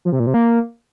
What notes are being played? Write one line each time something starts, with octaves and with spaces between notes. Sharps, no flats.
F3
C3
A#2
C3
A#3